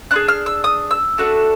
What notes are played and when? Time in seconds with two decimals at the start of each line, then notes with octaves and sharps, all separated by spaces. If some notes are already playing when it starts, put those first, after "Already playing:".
0.11 D4 F4 G#4 F#6
0.28 F6
0.46 E6
0.64 D#6
0.91 E6
1.18 A3 D4 F#4 A4